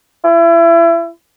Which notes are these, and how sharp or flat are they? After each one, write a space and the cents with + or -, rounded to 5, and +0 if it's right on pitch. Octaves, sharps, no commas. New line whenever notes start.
E4 +30